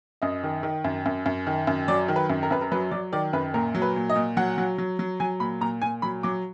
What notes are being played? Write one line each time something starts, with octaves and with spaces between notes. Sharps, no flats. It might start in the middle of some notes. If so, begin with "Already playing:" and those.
F#2 D#5
D#3
D#3
F#2
F#2
F#2
D#3
F#2
F#3 D5
D#3
B4
F#2
A#4
F#2 B4
A#4
F#3 B4
F#3 D5
D#3 D5
F#2 B4
A#2 A#4
F#3
B4
A#2
D#5
A#2
F#3 F#5
F#3
F#3
F#3
F#3 G#5
A#2 B5
A#2 A#5
A#2 G#5
F#3 B5
F#3 D6